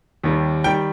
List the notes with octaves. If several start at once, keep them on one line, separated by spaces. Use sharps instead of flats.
D#2 D#3 G3
D#3 G3 G5